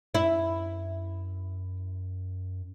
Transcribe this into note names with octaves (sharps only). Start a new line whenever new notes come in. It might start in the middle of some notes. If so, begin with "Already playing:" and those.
F#2 E4